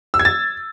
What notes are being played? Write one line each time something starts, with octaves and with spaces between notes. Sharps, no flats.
E6
G#6
A6